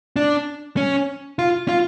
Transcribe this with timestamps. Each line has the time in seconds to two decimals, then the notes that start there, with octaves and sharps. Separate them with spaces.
0.16 D4
0.77 C#4
1.39 F4
1.68 F4